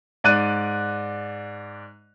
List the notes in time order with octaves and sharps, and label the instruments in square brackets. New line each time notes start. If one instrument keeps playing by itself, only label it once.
[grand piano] G#2 D5 F#6 D#7